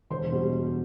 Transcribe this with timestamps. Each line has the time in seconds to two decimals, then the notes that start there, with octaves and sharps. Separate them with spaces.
0.10 E1 C5 C6
0.32 B2 G3